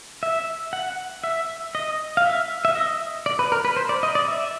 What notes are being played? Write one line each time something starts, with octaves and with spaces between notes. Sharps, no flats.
E5
F#5
E5
D#5
F5
E5
E5
D#5
D5
B4
A#4
B4
C5
D5
D#5
D5
E5